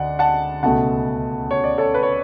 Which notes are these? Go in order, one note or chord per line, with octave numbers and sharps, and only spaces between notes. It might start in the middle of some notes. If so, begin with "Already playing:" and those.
Already playing: D2 G#3 D5 F#5
F#5 A5
C#2 B2 A3 F#5 A5
C#5
D5
A4 C#5
B4
C#5